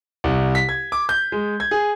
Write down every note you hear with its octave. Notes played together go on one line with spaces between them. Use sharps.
C2
B6
G#6
D6
G6
G#3
G#6
G#4